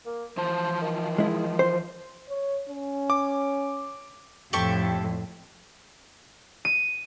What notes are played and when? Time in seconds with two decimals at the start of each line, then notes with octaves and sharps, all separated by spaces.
0.06 A#3
0.37 E3 F3 C5 A5
0.82 D#3
1.18 G#3 E4
1.59 C5
2.29 C#5
2.69 C#4
3.10 D6
4.53 F2 A2 G4 A4 C#6
6.65 D#7